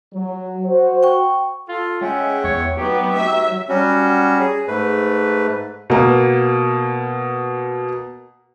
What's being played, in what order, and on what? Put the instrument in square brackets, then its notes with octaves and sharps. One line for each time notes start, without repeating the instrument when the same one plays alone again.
[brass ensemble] F#3
F#4 C5
[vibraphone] G5 C#6
[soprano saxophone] F4 [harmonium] A4
[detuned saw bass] G#3 [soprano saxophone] C#4 [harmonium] E5 F#5 G5
[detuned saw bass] E2 [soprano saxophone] C#5
[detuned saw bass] F#3 [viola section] B3 [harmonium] D#4 F#4 [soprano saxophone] G4
[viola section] E5
[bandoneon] F#3 G3 C#4 F#4
G#4
G#2 A3 B4
[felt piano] B2 A#3